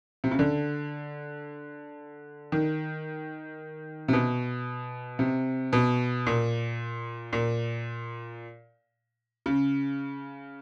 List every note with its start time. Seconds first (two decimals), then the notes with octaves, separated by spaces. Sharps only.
0.24 C3
0.31 C#3
0.39 D3
2.52 D#3
4.08 C3
4.13 B2
5.19 C3
5.73 B2
6.26 A#2
7.33 A#2
9.46 C#3